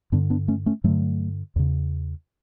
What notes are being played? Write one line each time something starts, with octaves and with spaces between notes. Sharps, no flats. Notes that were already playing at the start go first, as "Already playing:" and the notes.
G2 D3 B3 D4
B3 D4
A3 C#4
A3 C#4
G2 D3 F#3 A3
E2 C#3